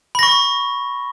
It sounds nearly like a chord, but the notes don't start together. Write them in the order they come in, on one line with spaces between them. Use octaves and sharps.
B5 A#6 C#6